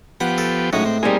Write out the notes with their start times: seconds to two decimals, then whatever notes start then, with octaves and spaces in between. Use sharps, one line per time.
0.20 F3 B3 G4 F#5
0.38 A4
0.73 A2 F#3 G#3 C#4 D#4
0.85 C4
1.03 G3 A#3 C4 D#4 G#4